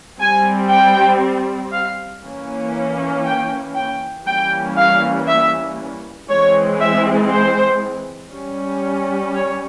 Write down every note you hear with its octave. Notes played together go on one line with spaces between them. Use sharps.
G3 C4 G#5
G5
F5
E3 A#3 C#4
G5
G5
E3 G3 A#3 C#4 G5
F5
E5
E3 G#3 C4 C#5
E5
C5
G3 C#4
C#5